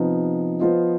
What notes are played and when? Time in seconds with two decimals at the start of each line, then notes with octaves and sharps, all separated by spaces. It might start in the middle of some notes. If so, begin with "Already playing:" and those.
Already playing: C3 F3 B3 D#4
0.60 F3 B3 F4 C5 D#5